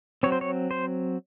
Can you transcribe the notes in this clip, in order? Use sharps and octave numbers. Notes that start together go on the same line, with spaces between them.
F#3 C4 C#5
C5
C#5
C5